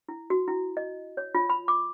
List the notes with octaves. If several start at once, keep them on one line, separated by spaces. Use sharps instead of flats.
E4
F#4
E4
D#5
C#5
F4
B5
D6